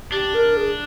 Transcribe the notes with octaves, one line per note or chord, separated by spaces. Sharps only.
D4 G4
A#4
G#4